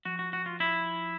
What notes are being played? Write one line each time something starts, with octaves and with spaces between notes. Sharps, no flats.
F3 F#4
F#4
F#4
F4
E4